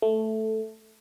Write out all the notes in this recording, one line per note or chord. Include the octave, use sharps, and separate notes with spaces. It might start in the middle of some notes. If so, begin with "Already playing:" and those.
A3